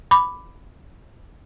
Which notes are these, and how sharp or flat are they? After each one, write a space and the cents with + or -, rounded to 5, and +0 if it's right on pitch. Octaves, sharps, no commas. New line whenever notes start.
B5 +5 D6 +0